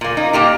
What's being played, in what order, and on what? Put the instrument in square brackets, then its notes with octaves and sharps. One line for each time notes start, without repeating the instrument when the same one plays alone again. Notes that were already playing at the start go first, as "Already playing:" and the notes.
[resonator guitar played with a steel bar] A#2 A#3
D#4
A#2 A#3 G4